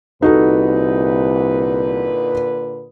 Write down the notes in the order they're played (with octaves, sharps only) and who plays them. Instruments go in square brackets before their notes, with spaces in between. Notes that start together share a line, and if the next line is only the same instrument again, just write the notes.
[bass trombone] C2 [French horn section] A#2 D3 B4 [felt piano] D#4 F#4 A4